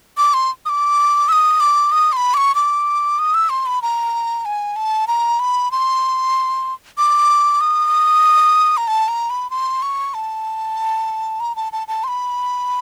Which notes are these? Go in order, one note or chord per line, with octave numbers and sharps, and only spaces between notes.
D6
C6
D#6
D6
E6
D#6
D6
D#6
C6
B5
D6
C#6
D6
D#6
E6
C6
B5
A#5
G#5
A5
A#5
B5
C6
D6
D#6
A#5
A5
A#5
B5
C6
C#6
A5
A#5
A5
A5
A5
C6
B5